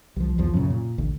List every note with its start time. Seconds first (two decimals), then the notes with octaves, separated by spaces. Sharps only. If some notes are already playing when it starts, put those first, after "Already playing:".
0.16 C2 F3
0.38 B1 E2 F3
0.53 F#2 A#2 C#3
0.70 A#2
0.98 A1 D2